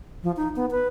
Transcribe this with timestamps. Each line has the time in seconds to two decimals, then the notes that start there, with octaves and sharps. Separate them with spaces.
0.23 F3
0.37 D#4
0.56 B3
0.71 B4